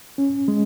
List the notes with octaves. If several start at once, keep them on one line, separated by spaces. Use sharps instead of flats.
C#4
G#3